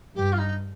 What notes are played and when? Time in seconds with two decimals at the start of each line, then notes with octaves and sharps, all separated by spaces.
0.15 G2 G4
0.32 F4
0.38 D#4